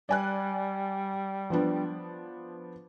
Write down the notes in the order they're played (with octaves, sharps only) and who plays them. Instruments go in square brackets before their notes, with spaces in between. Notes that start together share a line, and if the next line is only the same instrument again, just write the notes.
[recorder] G3 [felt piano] D5 G#5 F#6
[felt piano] F3 B3 D4